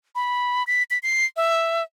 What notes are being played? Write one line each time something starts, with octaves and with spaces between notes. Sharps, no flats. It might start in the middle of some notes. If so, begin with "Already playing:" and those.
B5
B6
B6
C7
E5